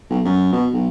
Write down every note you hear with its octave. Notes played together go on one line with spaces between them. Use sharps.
B1
F#2
B2
B1